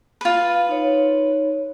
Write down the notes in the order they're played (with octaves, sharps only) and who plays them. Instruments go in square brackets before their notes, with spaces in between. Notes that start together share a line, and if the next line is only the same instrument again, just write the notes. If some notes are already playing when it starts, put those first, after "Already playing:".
[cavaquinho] F4 B4
[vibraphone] D#4 C#5